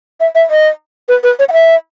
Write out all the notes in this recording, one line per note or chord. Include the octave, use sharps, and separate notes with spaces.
E5
E5
D#5
B4
B4
C#5
F#5
E5